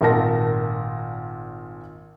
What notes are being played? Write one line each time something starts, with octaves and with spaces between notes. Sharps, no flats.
G#1 A#2 A#4 A5 A#6